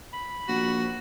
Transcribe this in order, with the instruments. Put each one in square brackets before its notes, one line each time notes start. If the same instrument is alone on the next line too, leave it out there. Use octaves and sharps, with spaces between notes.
[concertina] B5
[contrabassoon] A#1 [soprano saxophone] F#4